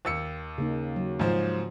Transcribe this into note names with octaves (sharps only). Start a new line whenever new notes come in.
D#2 E6 C#7
C#3 A#3 D#4
F#3
G#2 F3 C5